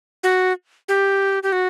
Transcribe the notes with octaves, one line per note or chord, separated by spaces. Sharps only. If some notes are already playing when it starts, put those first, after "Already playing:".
F#4
G4
G4
F#4